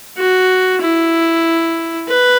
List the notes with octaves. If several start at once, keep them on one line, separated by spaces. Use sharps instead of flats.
F#4
E4
B4